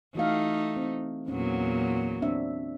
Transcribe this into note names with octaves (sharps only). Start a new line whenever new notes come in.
E3 A3 D#4 F#4 F5
C4
E2 A#2 F#3 C#4
C4 D4 E5